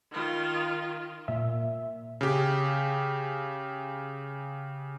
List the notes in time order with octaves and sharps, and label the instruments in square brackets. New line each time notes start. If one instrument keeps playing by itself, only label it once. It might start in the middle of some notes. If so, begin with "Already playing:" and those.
[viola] D#3 F4
[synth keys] A#2 E5
[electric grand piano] C#3 G4